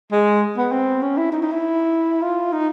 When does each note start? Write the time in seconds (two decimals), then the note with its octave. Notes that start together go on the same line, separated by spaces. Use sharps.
0.12 G#3
0.57 B3
0.72 C4
1.02 C#4
1.17 E4
1.32 D#4
1.42 D#4
1.52 E4
2.22 F4
2.52 D#4